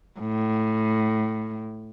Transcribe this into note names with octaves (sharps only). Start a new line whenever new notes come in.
A2